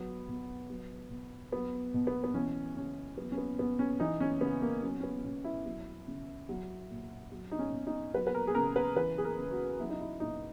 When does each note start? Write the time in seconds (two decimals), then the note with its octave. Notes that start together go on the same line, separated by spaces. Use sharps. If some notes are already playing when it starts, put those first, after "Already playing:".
Already playing: F#3 B3
0.28 B2
0.70 F#3
1.10 B2
1.52 F#3 B3
1.94 B2
2.07 B3
2.24 B3
2.34 E3 C#4
2.76 C#3 C#4
3.17 F#3 B3
3.32 C#4
3.38 B3
3.59 B2 B3
3.79 C#4
4.00 E3 D#4
4.20 C#4
4.41 C#3 B3
4.62 A#3
4.82 F#3 C#4
5.00 C#4
5.03 B3
5.24 B2 C#4
5.44 E4
5.65 F#3
6.08 C#3
6.49 F#3
6.90 A#2
7.32 F#3
7.51 D#4
7.59 C#4
7.72 B2
7.87 D#4
8.14 F#3 B4
8.27 B4
8.34 A#4
8.47 G#4
8.55 C#3 A#4
8.76 B4
8.96 E3 B4
9.18 G#4
9.24 A#4
9.39 C#3
9.51 F#4
9.80 F#3 E4
9.90 D#4
10.00 E4
10.20 A#2 D#4